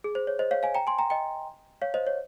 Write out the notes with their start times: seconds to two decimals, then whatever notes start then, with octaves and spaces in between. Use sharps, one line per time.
0.04 G#4
0.15 C5
0.27 C#5
0.39 C5 D#5
0.51 C#5 F5
0.63 F5 G#5
0.75 G5 A#5
0.87 G#5 C6
0.99 G5 A#5
1.10 D#5 G5
1.82 C#5 F5
1.94 C5 D#5
2.07 C#5